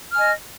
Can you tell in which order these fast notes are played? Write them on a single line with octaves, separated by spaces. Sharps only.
F6 G#5 D#5